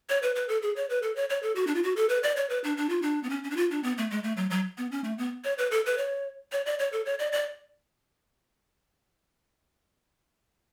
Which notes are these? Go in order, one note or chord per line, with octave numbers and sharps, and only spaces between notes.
C#5
B4
B4
A4
G#4
C#5
B4
A4
C#5
C#5
A4
F#4
D4
F4
F#4
A4
B4
D5
C#5
B4
D4
D4
F4
D4
B3
C#4
C#4
D4
F4
D4
B3
A3
G#3
A3
F#3
F#3
B3
C#4
A3
B3
C#5
B4
A4
B4
C#5
C#5
D5
C#5
A4
C#5
D5
D5